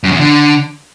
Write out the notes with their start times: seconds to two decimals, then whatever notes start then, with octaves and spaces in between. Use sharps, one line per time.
0.04 F#2
0.12 E2
0.20 D3